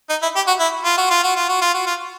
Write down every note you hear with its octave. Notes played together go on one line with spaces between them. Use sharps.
D#4
E4
G4
F#4
E4
F4
F#4
F4
F#4
F4
F#4
F4
F#4
F4